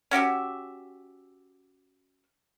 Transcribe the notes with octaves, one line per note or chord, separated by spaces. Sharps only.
C#4 F#4 G4 E5